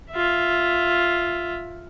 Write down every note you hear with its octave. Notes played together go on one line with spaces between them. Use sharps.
F4 E5